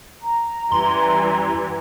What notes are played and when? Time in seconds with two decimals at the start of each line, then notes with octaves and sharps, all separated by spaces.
0.22 A#5
0.72 F#2 E3 G3 G#5 C6